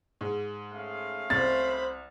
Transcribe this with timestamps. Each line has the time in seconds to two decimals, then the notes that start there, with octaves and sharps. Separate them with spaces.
0.21 G#2
0.71 A3 C#4 F5
1.30 C2 C5 B5 A6